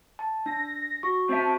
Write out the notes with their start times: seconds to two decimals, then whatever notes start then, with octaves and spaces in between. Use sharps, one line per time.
0.19 A5
0.46 D4 A#6
1.03 F#4 C#6
1.29 C4 E5 A5